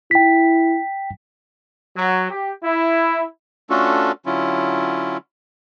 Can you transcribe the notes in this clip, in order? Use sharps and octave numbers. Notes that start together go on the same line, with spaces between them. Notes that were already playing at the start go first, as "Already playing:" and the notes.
E4 G5 B6
F#3
G4
E4
A3 C#4 D4 F4 F#4 A4
D3 F#3 C#4 E4 F4